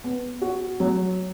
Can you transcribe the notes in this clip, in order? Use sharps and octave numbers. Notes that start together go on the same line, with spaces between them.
B3
F#4
F#3